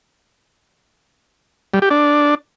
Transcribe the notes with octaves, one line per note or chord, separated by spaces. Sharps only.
G3
G4
D4